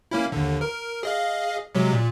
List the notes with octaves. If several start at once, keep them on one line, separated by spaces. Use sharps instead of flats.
A#3 C#4 E4
D#2 D3
A#4
G#4 D#5 F5
C3 F#3 G#3
A#2